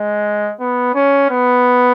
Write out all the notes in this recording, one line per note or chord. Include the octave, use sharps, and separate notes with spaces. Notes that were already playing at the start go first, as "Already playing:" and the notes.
Already playing: G#3
B3
C#4
B3